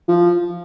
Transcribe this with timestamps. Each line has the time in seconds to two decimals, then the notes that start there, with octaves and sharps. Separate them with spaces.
0.08 F3